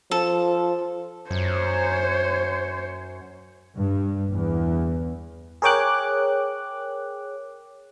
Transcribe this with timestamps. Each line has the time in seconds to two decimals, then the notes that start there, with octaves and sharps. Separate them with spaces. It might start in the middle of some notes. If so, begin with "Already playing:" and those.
0.11 F3 A4
1.31 F#2 C5 C#5
3.75 G2
4.31 E2
5.62 G#4 A#4 C#5 G5 D6 F#6